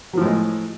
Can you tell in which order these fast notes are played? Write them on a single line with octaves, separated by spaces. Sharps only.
F#3 F3 A2 G#3